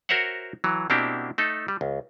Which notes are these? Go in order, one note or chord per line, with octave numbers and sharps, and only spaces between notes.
F#4 A#4 C5 C#5 E5 F#5
E3 F#3
B2 A#3 C4 D4 E4 G4
A3 D#4 A4
G3
C#2